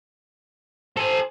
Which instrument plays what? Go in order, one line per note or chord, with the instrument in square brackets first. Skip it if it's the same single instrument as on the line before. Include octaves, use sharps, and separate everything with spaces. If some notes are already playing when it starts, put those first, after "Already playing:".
[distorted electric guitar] A4 G#5 [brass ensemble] C5